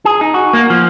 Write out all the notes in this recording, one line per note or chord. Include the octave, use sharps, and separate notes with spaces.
G#4
D#4
F#4
A#3
F3